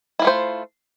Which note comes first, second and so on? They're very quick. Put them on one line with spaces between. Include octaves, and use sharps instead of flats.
E4 F4 A3 C5